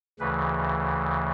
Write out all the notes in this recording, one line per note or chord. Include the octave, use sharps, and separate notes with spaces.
D2 C#3 E3 B4